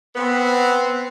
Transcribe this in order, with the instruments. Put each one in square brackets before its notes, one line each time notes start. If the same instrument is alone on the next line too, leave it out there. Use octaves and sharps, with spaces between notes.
[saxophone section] B3 [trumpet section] C4 F#5